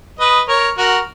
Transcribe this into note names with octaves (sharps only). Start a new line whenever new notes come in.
B4 D#5
A#4 C#5
F#4 A#4